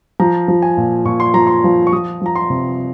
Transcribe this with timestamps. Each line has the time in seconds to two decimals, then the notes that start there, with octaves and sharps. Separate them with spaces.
0.20 F3 A#5
0.48 F3
0.62 G#5
0.77 A#2
1.05 A#2 C#6
1.20 C6
1.34 F3 A#5
1.47 C6
1.64 F3
1.87 C#6
1.92 F3 D#6
2.21 F3 A#5
2.36 C6
2.50 C3